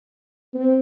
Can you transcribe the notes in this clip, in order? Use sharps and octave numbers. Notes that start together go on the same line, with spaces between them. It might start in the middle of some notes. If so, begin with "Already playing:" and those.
C4